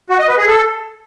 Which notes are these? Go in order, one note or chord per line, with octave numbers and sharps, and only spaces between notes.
F#4
D#5
B4
G#4
A4